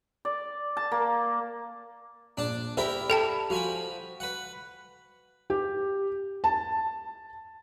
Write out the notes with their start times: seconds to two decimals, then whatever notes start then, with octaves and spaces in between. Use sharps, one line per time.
0.25 D5
0.77 A5
0.92 A#3
2.37 A#1 D4 A5
2.77 E4 G4 A#4 D5 B5
3.10 A4 G5 A5 B5
3.50 F3 F#4 G#5 B5
4.20 B4 F#5
5.50 G4
6.44 A5